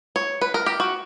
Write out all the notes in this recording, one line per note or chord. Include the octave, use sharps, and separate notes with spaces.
C#5
B4
A#4
G4
F#4